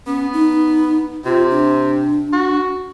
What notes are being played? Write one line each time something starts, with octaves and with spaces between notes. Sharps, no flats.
B3 C#4
D#4
C3 F4
D4
F#4